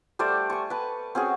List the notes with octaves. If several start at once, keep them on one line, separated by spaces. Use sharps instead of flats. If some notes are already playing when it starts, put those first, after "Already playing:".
G3 A3 C5 D5
G#5 C#6
B4 A5
C4 C#4 F#4 G#4